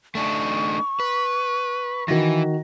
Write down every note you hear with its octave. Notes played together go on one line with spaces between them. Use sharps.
A3 D4 D#4 C#6
B4
D#3 E3 F#4 A#6